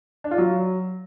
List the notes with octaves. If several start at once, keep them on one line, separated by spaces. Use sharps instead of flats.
D4
F4
F#3